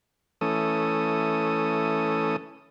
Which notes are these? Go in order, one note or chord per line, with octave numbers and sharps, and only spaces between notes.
E3 A3 C#4 A4 D#6